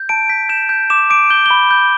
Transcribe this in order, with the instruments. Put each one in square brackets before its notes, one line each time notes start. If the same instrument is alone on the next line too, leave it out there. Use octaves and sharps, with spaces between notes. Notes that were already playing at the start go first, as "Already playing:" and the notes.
Already playing: [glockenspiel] G6
A5 D7
G6 B6
G6 E7
G6
D6 E7
D6 D7
G6 G7
B5 G7
G6